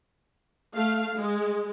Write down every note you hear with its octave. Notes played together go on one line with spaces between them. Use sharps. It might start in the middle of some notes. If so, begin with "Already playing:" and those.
A3 F5
G#3